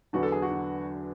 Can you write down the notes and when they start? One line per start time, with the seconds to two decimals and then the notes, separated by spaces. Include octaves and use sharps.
0.13 E2 D3 F#3 B3 D4 F#4
0.23 A4
0.32 G#4
0.42 F#4
0.51 D3